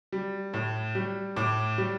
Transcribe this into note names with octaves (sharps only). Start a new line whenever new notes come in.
G3
A2
G3
A2 D6
G3